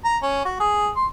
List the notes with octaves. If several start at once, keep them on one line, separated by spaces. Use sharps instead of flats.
A#5
C#4
F#4
G#4
C6